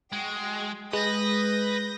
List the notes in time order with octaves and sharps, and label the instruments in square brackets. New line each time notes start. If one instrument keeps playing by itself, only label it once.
[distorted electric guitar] G#3 [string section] F#4 G5
[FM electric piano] G#3 [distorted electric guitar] B4 [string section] D#6 G6 A#6